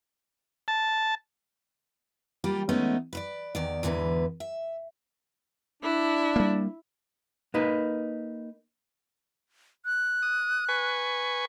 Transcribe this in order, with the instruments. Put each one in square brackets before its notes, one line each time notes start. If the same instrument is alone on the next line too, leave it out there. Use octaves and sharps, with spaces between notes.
[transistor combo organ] A5
[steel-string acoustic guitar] G3 A#3 F4 G4
G#3 A3 B3 C#4 D#4
B4 C5 D5
E2 D#3 D5
E2 G#2 D3 E3 B4
E5
[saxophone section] D4 [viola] E4
[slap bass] G3 A#3
[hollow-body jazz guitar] A#3 D#4 B4
[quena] F#6
[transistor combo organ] D#6
B4 G#5 C#6